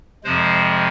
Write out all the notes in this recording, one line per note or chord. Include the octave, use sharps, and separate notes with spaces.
F2 C3 F3 G#3 C5